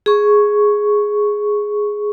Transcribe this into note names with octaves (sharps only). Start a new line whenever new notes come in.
G#4 C#6